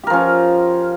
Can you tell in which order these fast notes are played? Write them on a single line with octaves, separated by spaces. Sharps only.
G4 A#4 F3 C#4